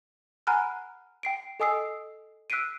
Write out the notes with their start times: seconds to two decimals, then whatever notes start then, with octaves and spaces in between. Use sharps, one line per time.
0.47 F#5 G#5 A#5 B5 F6 F#6
1.23 G5 C7 D7
1.60 A4 D#5 G#5 D#6 E6 C7
2.50 E6 F#6 B6 C7 D7 D#7